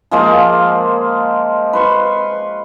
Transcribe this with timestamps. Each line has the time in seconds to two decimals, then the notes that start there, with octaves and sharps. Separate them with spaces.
0.11 F3 G#3 A#3 F4
1.73 B4 C6 C#6